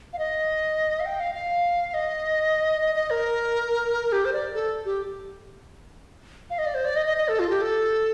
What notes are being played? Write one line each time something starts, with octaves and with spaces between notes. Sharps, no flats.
F5
D#5
F5
G5
F5
F5
D#5
D#5
D#5
A#4
G4
C5
D5
A4
G4
F5
D#5
D5
C5
D5
D#5
D#5
D#5
A4
F4
G4
A4